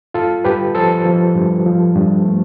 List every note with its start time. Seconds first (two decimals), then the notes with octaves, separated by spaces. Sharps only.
0.14 G2 F4 A4
0.44 G2 G4 B4
0.74 F3 A4 C5
1.05 F3
1.35 G2
1.66 F3
1.95 G2
2.25 A3